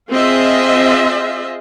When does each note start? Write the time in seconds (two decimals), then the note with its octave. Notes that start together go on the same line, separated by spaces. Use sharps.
0.10 C4 F4 G#4 D#5 E5